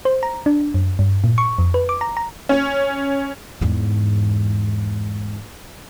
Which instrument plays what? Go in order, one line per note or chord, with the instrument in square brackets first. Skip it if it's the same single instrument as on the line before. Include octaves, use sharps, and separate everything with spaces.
[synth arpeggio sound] C5
A#5
D4
F#2
G2
A#2
C#6
F2
B4
D6
A#5
A#5
[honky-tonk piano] C#4
[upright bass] E2 G#2